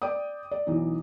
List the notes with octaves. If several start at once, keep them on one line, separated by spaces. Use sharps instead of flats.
D5 G5 D6 D#6
D5
B1 E3 D#4